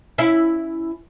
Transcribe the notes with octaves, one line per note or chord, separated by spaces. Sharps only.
C#4 E4